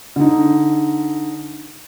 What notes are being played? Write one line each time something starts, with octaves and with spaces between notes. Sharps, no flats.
D3 D#4